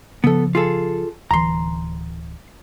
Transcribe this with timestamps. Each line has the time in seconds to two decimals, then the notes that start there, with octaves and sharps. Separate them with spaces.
0.24 C#3 F3 B3 A4
0.55 F4 G#4 A4
1.31 D1 E3 A#5 C6